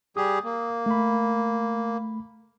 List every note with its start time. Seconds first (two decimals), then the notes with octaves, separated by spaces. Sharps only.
0.17 G3 G4 G#4 D#6
0.44 A#3
0.86 A3 B5